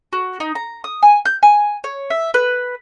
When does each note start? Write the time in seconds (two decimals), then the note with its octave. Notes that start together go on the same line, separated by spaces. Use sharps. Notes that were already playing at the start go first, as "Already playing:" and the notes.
0.13 F#4
0.40 D#4
0.55 A#5
0.84 D#6
1.03 G#5
1.25 G6
1.43 G#5
1.84 C#5
2.10 E5
2.34 B4